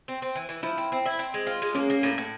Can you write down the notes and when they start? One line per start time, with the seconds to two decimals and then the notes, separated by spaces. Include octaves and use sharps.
0.08 C4
0.22 C4
0.35 E3
0.49 E3
0.63 F3 E4
0.78 C4
0.92 C4
1.06 E4
1.19 C4
1.34 G#3
1.47 F4
1.62 G#3
1.75 A#3 C#4
1.90 A#3
2.03 A2
2.18 A2